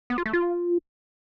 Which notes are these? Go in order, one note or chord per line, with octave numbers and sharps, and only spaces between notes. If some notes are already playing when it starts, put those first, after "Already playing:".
B3
F4
A3
F4